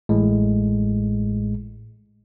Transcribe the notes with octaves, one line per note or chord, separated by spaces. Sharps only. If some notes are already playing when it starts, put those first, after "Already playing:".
A1 A2 G#3